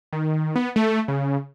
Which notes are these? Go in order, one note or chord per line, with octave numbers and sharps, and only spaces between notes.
D#3
B3
A3
C#3